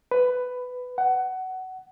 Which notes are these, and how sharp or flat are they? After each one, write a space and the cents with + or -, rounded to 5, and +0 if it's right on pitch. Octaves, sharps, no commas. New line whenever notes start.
B4 +15
F#5 +20